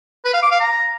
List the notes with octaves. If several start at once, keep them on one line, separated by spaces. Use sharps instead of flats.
B4
F5
D6
F5
A#5